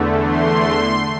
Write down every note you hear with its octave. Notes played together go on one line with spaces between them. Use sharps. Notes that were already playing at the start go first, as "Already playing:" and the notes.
Already playing: E2 D3 A3
C6